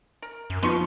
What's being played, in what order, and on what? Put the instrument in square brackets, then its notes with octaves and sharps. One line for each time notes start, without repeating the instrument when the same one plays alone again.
[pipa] A#4
[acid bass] F#2
[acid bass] F3 [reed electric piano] B3 D#4 F4 [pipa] B4 C6 C#6